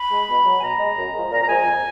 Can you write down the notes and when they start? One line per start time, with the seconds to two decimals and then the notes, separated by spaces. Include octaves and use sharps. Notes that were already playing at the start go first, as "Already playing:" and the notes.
Already playing: B5
0.10 G#3
0.29 B2
0.45 F#3
0.58 G#5
0.62 B2 A#5
0.79 G#3
0.97 F#2
1.14 F3 G#3
1.32 A#2 A#5
1.42 A#5
1.49 F3 G#3 G#5
1.65 F2